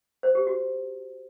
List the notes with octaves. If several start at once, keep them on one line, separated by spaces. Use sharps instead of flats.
C5
G4
F#4